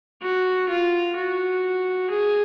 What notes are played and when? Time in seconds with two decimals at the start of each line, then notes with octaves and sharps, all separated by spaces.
0.22 F#4
0.69 F4
1.16 F#4
2.10 G#4